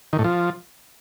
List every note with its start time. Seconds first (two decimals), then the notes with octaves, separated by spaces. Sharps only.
0.13 D#3
0.19 A2
0.24 F3